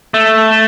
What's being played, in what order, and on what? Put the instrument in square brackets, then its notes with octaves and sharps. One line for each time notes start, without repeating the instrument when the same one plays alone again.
[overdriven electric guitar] A3